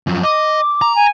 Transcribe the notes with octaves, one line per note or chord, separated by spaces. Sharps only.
F#2 F3
D#5 D6
A#5
G#5